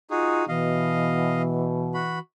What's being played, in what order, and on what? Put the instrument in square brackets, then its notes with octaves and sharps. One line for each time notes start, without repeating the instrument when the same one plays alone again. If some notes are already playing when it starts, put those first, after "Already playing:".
[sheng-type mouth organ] D#4 F#4 G#4 [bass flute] F4
[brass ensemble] B2 [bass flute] E3 [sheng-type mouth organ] D#5 F5
[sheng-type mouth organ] F#4 B5